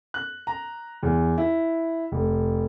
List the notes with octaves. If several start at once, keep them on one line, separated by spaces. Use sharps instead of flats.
F#6
A#5
E2
E4
F1